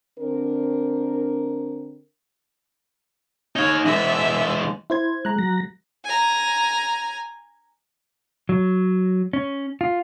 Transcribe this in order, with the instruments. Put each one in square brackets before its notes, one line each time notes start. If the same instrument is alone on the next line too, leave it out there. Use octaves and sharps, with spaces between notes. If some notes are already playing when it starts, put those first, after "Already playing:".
[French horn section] D3 C4 D4 A#4
[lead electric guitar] D#4 F5 [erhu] C#5
[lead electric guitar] E3 G#3 [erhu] E5
[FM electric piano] E4 C5 G#6
[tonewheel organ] G#3 [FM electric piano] A#5 F#6
[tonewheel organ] F#3 A#6
[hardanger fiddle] G#5 A#5
[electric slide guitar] F#3
C#4
F4